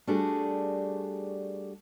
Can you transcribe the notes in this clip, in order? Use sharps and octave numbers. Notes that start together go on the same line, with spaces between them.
G3 A3 D4 F#4 G#4